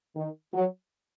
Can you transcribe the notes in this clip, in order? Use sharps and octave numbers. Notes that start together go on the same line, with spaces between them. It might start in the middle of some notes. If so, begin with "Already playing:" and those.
D#3
F#3